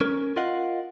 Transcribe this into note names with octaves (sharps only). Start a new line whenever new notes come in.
C#4 A#4
F4 A#4 D#5 F5 F#5